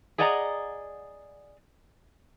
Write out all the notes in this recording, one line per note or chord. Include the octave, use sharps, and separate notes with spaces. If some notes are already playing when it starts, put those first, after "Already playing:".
G#4 D5 D#5 F#5 G#5 A#5